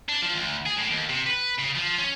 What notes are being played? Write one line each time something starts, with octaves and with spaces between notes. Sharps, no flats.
D4
F3
D2
G#4
A2
D#2
C3
B4
C#3
F3
C#4